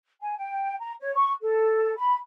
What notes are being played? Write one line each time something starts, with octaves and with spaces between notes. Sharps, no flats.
G#5
G5
A#5
C#5
C#6
A4
B5